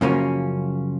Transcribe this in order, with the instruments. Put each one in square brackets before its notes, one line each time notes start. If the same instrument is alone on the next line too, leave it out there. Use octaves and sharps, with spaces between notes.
[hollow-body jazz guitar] F#2 C#3 F3 A#3 C#4